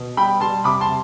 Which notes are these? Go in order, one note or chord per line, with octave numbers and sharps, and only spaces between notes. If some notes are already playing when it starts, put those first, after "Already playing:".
Already playing: B2
G3 G5 B5
G3 A5 C6
C3 B5 D6
A5 C6
C3